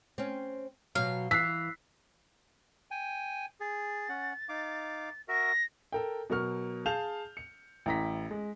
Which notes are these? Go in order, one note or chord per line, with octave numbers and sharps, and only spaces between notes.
C4 C#4
B2 F#3 F5
E3 E6 F#6 B6 C7
G5 G#5
G#4 A6
C#4 F#5
D#4 F5 D6
F#4 A#4 E5 A#6
A4 A#4 G5
B2 F#3 A#4 C#6 F6
G#4 F5 A5 G6 F7
C#7
A1 E4 A#5 A#6 B6
G#3